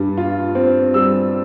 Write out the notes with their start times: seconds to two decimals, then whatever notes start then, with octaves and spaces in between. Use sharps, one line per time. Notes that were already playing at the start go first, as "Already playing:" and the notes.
Already playing: G2 G3
0.17 F4
0.55 C4
0.94 G3 E6